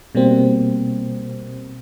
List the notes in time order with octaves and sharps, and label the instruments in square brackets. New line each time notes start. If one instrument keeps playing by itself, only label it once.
[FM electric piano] B2 G3 A#3 C4